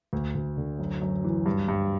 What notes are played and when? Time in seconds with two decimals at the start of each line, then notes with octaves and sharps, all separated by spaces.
0.13 D2
0.35 D2
0.57 D3
0.79 F#2
1.02 F#2
1.24 E3
1.46 G2
1.68 G2